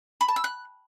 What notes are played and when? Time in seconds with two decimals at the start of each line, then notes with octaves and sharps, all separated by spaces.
0.21 B5
0.28 A5
0.36 E6
0.44 F#6